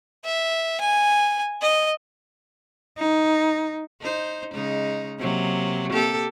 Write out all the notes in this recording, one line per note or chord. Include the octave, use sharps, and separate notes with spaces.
E5
G#5
D#5
D#4
D#4 C5
C#3 G#3 D#4
C3 F#3 A#3
A#3 G4 A4